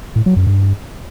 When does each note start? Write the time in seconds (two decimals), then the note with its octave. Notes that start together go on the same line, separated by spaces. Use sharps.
0.16 A2
0.26 F#3
0.36 F#2
0.47 G2